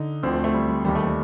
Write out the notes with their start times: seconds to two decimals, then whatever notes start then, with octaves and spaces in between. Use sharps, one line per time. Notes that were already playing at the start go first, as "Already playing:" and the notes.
Already playing: D3 D#4
0.23 D2 D3 F3 C4
0.33 A3
0.44 A3
0.54 G3
0.69 G3
0.84 D#2 D#3 G3
0.95 A3
1.05 G3